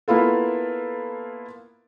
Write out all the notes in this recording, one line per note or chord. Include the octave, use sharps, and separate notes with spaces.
A#3 B3 E4 F4 A4